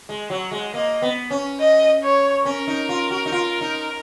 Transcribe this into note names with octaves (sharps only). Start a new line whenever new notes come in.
G#3
F#3 F#5
G#3
A#3 D#5
B3
C#4
D#5
C#5
C#4 A#4
D#4
F4
F#4
D#4
F4
D#4